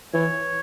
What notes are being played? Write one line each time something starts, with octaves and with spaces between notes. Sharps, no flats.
E3 C#5